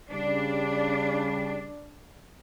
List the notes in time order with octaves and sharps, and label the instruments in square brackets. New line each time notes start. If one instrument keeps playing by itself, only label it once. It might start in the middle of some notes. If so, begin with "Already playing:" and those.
[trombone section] C#3 G3 [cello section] D4